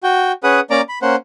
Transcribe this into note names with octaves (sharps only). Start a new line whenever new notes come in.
F#4 G5
C#4 G#4 B4 F#5 D#6
A#3 C#4 D5 A#5 D6
B5
A#3 C#4 C5 F#5